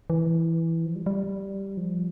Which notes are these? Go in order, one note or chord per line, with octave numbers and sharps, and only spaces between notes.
E3
F3
G3
G3
F3